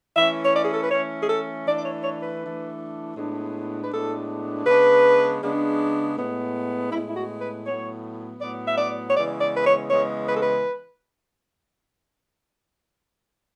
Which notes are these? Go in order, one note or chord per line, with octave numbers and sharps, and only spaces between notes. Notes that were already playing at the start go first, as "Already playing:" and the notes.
E3 A3 C#4 E5
C#5
D5
G#4
A4
B4
E3 A3 C#4 C#5
G#4
A4
E3 A3 D4 D5
D5
C#5
C#5
B4
E3 A3 D4
A2 G#3 B3 D4
B4
A2 G#3 B3 D4 A4
C#3 G#3 B3 D4 B4
C#3 G#3 B3 D4
A2 G#3 B3
A2 G#3 B3 E4
E4
F#4
B4
A2 F#3 B3 C#5
A2 F#3 B3 D5
E5
D5
C#5
C#3 E3 G#3 B3 D5
D5
B4
C#5
C#3 E3 G#3 B3 C#5
B4
A4
B4